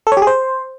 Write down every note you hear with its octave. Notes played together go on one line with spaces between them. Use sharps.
A4
C#5
G4
G#4
C5